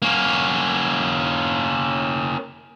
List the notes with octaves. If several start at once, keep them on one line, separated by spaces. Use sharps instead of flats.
A#3 C#4